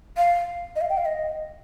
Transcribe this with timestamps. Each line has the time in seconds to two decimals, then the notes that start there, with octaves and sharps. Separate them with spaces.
0.17 F5
0.76 D#5
0.81 F5
0.90 G5
0.97 F5
1.06 D#5